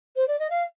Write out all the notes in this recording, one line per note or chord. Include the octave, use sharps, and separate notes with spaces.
C5
D5
D#5
F5